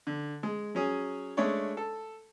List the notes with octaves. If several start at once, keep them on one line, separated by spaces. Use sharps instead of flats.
D3
G#3
F#3 C#4 G#4
G#3 A3 D4 C#5 D5
A4